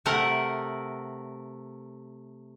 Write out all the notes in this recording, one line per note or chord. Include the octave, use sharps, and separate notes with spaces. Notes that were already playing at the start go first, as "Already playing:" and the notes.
C3 A3 A#4 F#5